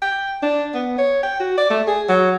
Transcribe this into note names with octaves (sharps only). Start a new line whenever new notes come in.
G5
D4
B3
C#5
G5
F#4
D5
A3
G#4
F#3